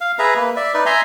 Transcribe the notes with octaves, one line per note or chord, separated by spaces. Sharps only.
F5
G#4 B4 E5 A#5
A#3 B4
D5 E5
D#4 B4 D5
E5 G#5 A#5 C6